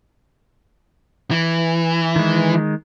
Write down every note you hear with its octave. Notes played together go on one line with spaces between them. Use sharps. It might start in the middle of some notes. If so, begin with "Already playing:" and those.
E3
D#3 G#3